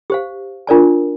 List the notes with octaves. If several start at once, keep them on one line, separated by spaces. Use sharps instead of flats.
G4 C5 F5
D4 F4 A#4 D5 A5